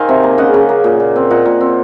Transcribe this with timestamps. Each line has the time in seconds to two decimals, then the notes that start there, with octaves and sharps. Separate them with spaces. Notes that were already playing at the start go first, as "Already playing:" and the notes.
Already playing: D#3 C4 D#5 F5 G#5
0.09 C3
0.23 A#3
0.38 C#3 D#5 F#5
0.54 C#3
0.69 A#3
0.84 A#2
1.00 A#2
1.16 C4
1.30 A#2 D#5 F#5
1.46 A#2
1.61 C4